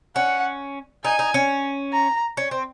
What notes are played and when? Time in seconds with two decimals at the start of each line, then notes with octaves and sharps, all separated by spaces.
0.15 C#4 F#5
1.04 D#4 G#5
1.19 D#4
1.34 C#4
1.93 A#5
2.37 C#4
2.51 C4